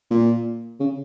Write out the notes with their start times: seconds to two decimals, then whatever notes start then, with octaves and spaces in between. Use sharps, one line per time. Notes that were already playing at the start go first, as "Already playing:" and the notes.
0.10 A#2
0.80 C#3